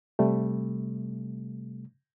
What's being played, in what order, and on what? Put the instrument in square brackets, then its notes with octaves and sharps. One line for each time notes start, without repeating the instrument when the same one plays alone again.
[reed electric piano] C3 G3 A3